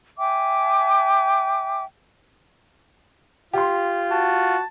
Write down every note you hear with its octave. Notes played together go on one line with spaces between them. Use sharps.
E5 G5 G#5 D6
F4 G4 C6
F#4 A5